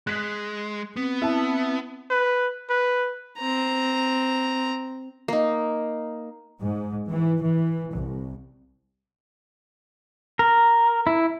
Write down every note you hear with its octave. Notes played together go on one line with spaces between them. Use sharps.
G#3 F#6 B6
B3 C4
E4 A5
B4
B4
C4 A#5
A#3 D#4
G#2
E3
E3
C2
A#4
E4